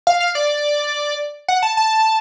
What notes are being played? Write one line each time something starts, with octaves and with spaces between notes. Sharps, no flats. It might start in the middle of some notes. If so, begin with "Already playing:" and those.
F5
F5
D5
F#5
A5
A5